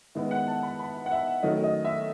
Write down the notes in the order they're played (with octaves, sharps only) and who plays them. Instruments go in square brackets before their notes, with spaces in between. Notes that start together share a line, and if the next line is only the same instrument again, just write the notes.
[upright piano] D#3 G#3 B3 E5
F#5
A5
B5
B5
F#5
E5
D#3 F#3 A3 C#4 D#5
D#5
E5